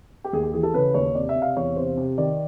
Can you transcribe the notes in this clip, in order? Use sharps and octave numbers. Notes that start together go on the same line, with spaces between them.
G4
D#2 G#4
G4
E3 G#4
A4
C#3 B4
D#2 C#5
C3 D5
E5
C3
F5
E2 C#5
C3 C5
C3
D#3 D5